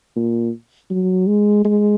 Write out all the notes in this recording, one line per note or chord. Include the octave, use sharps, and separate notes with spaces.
A#2
F#3
G#3
G#3